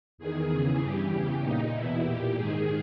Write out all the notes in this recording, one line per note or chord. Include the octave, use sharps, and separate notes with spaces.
E2 D#3 G#4
E2 C#3 E3
G2 E3 G4
E2 C#3 E3 G4
A#2 D#4
E2 B2 E4
A#2 G4
G#2 D#3 G#4